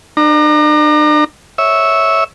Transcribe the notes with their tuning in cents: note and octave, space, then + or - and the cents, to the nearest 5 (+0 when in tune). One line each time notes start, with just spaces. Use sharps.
D4 +40 A#5 +0
C#5 +0 E5 -10